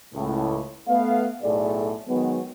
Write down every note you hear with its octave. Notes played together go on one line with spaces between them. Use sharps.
C#2 A2
A3 B3 F5
B1 A2 G#4 A4 D5
D#3 F#3 G#3 B3